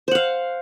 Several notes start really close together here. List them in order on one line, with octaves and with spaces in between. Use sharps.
C5 F#5 F5